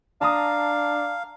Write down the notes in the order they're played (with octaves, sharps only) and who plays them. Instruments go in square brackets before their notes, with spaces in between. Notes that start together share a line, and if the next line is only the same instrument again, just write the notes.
[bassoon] D4 [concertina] F5 [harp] A5 A#5 D#6